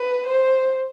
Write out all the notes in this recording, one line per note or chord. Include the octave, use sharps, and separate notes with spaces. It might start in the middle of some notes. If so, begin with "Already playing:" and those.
Already playing: B4
C5